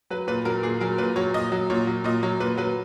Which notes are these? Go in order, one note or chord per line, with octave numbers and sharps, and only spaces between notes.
F#3 B4
A#2 B4
F#3 A#4
A#2 G#4
F#3 A#4
A#2 B4
F#3 C#5
A#2 D#5
F#3
A#2 C#5
F#3
A#2 D#5
F#3 C#5
A#2 B4
F#3 B4